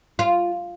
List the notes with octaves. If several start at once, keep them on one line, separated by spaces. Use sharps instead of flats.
F4